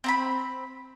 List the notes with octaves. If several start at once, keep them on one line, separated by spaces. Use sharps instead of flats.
C4 A#5 B5